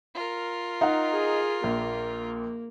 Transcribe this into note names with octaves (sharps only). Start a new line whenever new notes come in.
F4 A#4
D#4 F#5
G#4
A#1 A#3